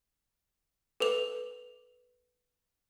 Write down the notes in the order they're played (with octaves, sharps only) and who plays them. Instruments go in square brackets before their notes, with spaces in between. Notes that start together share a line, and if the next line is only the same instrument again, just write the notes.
[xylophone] A4 B4 F7